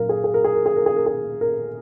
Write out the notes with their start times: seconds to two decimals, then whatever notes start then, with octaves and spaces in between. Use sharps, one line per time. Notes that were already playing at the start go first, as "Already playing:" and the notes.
Already playing: A#2 F#3 A#4 F5
0.09 G#4
0.24 G#4
0.34 A#4
0.44 G#4
0.55 A#4
0.66 G#4
0.76 A#4
0.86 G#4
0.96 A#4
1.06 G#4
1.41 A#4